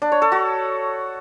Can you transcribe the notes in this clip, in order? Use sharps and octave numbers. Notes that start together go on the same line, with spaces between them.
D4
C#5
A4
F#4